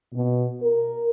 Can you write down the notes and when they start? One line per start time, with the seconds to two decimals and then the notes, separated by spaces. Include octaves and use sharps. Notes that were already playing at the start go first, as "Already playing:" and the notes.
0.13 B2
0.61 A#4